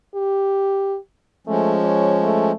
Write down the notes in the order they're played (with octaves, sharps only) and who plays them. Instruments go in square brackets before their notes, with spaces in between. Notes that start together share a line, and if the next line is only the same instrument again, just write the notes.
[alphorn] G4
[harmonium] F3 G#3 C#4 [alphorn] A3
[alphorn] C#5
A3